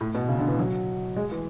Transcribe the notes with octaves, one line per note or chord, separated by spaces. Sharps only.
A2
B2
C#3
D3
E3
F#3
G#3
E3